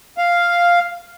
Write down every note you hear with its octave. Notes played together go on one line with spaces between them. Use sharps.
F5